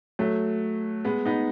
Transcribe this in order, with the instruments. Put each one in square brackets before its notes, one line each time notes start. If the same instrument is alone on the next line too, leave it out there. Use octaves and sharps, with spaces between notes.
[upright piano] F#3 A3
G#3 B3
B3 D#4